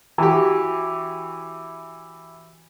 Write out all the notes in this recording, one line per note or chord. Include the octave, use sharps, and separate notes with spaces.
E3 F#4 G4